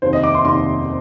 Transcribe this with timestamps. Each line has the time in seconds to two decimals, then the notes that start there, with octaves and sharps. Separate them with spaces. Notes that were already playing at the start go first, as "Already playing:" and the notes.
0.02 F1 D#2 D#3 C5
0.13 D#5
0.23 D6
0.34 C6
0.45 F1 D#2 D#3 C6